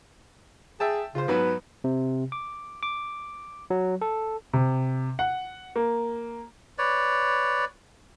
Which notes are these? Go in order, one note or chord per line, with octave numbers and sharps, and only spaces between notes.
G#4 E5 G5 A5
C#3 F4 C5
G#2 F#3 B3 B4
C3
D6
D6
F#3
A4
C3
F#5
A#3
B4 C#5 D5